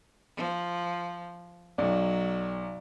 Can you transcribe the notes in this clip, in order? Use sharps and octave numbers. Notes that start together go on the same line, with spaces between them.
F3
B1 F#3 D5